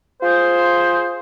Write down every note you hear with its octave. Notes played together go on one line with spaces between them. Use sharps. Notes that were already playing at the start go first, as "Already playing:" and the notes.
F4 G#4 C5